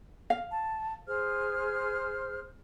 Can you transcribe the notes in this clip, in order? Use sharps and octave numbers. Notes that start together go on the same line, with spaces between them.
F5
A5
G#4 C5 F6